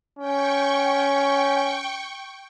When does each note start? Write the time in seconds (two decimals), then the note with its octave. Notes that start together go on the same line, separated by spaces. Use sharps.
0.19 C#4 G5 C#6